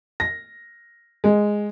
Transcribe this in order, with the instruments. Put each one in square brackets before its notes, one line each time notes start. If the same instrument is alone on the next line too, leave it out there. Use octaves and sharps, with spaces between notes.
[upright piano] A#6
G#3